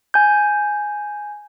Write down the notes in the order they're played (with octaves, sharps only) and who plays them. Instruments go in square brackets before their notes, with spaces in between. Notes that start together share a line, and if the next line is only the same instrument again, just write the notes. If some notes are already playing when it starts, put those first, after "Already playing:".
[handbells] G#5 G6